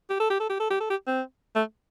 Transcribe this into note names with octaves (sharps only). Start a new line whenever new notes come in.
G4
A4
G4
A4
G4
A4
G4
A4
G4
C4
A3